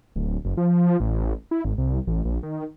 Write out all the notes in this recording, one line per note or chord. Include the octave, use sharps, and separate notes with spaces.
D1
F#1
F3
A1
E4
G#1
C2
A1
A#1
D#3